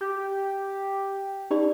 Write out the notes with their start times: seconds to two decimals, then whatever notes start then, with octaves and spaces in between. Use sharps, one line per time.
0.01 G4
1.51 D#4 G4 D5